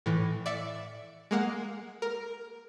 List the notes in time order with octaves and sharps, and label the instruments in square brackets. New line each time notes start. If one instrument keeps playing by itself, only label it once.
[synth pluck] A2 E3
D5 E5 C#7
G#3 A#3 F#5
A#4